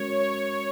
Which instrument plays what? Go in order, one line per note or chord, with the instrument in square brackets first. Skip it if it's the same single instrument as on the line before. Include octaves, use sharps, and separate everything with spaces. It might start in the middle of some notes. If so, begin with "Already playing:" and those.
Already playing: [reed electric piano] G#3 C#4 F#4 A#4 [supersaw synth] C#5
[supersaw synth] C#5